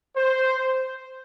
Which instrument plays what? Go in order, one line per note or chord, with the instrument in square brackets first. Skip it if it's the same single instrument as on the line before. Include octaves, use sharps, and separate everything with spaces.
[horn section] C5